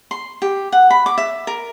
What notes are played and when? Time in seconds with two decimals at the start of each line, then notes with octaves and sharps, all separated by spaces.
0.11 C6
0.42 G4
0.72 F#5
0.90 B5
1.06 D6
1.18 E5
1.47 A#4